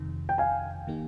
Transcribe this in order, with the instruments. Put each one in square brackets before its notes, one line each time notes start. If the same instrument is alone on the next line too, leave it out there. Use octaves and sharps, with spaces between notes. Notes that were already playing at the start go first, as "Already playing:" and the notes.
Already playing: [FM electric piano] F2 C3 D#3
[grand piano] G5
F5 G#5
[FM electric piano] D#3 A#3 D#4 G4